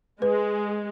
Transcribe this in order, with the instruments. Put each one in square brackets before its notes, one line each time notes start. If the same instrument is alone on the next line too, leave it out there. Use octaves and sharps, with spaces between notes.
[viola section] G#3 [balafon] B4